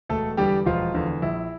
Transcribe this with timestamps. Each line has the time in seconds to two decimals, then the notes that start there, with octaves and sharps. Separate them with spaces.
0.09 E1 A3 A4
0.37 E2 D3 G3 G4
0.66 E1 F3 F4
0.94 E2 D3
1.22 A#1 E4